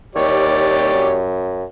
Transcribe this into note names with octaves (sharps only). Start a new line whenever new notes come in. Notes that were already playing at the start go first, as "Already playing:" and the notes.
D#2 G4 C#5 D5
F#2